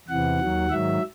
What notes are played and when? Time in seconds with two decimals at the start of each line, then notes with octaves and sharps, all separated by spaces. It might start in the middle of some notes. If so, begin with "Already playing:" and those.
0.08 E2 C3 E3 F#5
0.39 D#2 D#3 F#3
0.70 G#2 D#3 F#3 E5